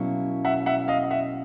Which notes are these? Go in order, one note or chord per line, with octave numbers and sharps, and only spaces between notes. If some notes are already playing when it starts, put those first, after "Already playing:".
Already playing: B2 F#3 A#3 C#4 E4
E5 F#5
E5 F#5
D#5 F5
E5 F#5